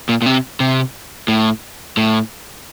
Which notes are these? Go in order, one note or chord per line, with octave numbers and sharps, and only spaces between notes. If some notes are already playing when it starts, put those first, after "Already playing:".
A#2
A#2
C3
C3
A2
A2